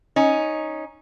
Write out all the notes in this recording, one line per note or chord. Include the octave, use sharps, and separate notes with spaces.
C#4 D#4